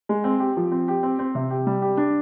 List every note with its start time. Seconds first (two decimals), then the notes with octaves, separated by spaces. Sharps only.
0.09 G#3
0.24 C4
0.40 G4
0.57 F3
0.72 C4
0.88 G4
1.03 C4
1.19 C4
1.35 C3
1.51 G4
1.67 G3
1.82 G4
1.97 D4